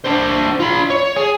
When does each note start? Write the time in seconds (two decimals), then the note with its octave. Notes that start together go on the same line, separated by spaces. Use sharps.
0.05 D4 C5
0.60 F4 B5
0.90 C#5
1.16 G#4